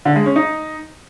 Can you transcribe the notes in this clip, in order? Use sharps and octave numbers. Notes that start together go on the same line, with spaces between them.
D3
G#3
C#4
D#4